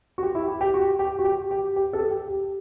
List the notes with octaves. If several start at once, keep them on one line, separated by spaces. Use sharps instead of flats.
F#4
G4
E4
G4
G4
F#4
G4
F#4
G4
G4
G4
A4
G4
G4